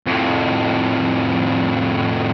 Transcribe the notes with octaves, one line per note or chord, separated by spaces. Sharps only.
F2 A2